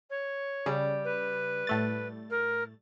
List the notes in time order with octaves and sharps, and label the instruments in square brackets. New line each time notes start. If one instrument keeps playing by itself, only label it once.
[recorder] C#5
[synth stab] C#3 [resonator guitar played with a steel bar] G3
[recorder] B4
[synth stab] A2 A3 A6
[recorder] A#4